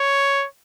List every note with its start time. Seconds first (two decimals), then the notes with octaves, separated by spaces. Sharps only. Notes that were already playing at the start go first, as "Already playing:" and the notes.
Already playing: C#5